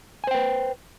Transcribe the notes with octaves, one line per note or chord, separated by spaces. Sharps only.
B4 C5 G5 G#5